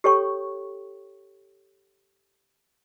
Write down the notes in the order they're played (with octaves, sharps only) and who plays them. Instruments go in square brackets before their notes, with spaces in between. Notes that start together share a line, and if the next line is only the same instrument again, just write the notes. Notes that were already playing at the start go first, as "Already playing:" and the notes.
[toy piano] G4 A4 C#5 G5 C#6